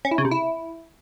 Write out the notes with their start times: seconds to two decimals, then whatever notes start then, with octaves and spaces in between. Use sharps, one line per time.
0.05 C#4
0.11 E4
0.18 C#3
0.25 C3
0.31 E4